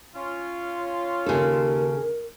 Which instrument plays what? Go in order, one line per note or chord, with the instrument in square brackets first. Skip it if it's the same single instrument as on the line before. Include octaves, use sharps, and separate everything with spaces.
[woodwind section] C#4 F4
[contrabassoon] D#2 [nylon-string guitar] C#3 A4 [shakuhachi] A#4